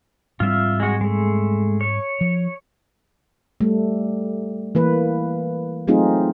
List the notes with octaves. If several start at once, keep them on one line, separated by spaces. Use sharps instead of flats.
G#2 G3 C4 F4 E5
G#3 F#4
G#3 A3
C#5
F3
G3 A3
E3 A#3 B4
F#3 A3 C4 D#4 F4 G#4